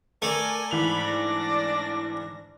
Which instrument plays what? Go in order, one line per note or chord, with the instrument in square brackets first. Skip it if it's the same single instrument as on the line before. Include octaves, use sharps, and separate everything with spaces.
[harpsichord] A3 [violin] A#4 G#5 [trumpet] D5
[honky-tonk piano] G#2 E3 F7 [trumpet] D5 [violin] B5
[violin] D4 A#6